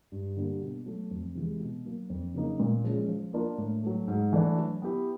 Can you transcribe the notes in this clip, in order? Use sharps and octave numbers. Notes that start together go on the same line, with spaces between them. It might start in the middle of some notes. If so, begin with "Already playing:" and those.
G2
D3 G3 A#3
B2
F#3 A3
F2
C3 E3 G#3
B2
F#3 A#3
F2
C#3 F#3 A#3 D#4
A#2
F3 G#3 C#4 F4
F3
A#3 D4 F4 A#4
A2
F#3 A3
G#2
E3 A3 D4
F#3
B3 E4 G4